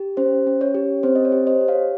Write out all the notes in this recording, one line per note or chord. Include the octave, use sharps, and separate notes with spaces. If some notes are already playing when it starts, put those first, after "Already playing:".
Already playing: G4
C#4 C5
C#4
C#5
G4
C4 C5
D#5
C#5
G4
C5 D#5
G4
C#5 F5